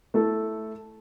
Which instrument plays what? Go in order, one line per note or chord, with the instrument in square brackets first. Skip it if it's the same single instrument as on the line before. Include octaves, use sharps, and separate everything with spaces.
[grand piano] A3 E4 A4